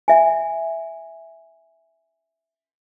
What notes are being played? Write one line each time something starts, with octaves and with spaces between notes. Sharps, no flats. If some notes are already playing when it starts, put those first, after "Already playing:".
E5 G#5